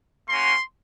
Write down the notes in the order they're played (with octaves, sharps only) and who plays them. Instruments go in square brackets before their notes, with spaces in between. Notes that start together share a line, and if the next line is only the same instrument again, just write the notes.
[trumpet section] A#3 C#4 F#4 C6